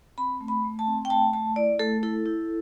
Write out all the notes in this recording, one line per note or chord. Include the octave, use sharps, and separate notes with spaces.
C4 B5
A3
B5
A3
A5
C4
G5
A3 A5
A3 A5
E4 D5
A3 A4
E4 A4
E4